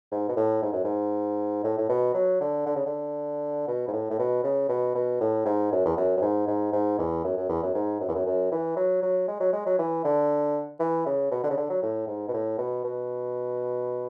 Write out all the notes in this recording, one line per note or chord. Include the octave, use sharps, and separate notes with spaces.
G#2
B2
A2
G#2
F#2
G#2
A2
A2
B2
F#3
D3
D3
C#3
D3
B2
G#2
A2
A2
B2
C#3
B2
B2
A2
G#2
F#2
E2
F#2
F#2
G#2
G#2
G#2
E2
F#2
F#2
E2
F#2
G#2
F#2
E2
F#2
F#2
E3
F#3
F#3
G#3
F#3
G#3
F#3
E3
D3
E3
C#3
B2
D3
C#3
D3
F#3
A2
G#2
B2
A2
B2
B2